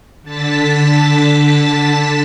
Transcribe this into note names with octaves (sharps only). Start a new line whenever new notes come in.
D3 A5 A6 B6